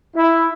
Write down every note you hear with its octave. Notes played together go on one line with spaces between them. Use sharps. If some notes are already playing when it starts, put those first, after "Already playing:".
E4